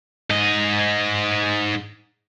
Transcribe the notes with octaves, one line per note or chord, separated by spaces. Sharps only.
G#2 D#5